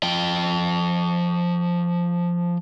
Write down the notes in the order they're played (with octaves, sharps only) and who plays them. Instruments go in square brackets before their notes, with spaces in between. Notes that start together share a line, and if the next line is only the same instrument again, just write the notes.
[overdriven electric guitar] F3 G5